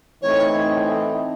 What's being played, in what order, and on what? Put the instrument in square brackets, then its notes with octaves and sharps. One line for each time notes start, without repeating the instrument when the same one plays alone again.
[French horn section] A2 E3 A3 C4 D#4 [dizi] C#5